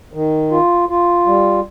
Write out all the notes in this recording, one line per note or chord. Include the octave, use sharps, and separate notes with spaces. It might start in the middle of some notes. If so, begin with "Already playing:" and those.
D#3
F4
F4
G3